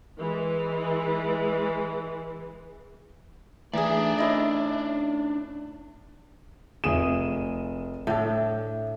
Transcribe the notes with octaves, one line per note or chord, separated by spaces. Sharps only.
E3 G#3
E3 A3 D4 D#4 G#4 D5
C#4 E4 D#5
F1 G#4 D#7 E7
A2 D4 E5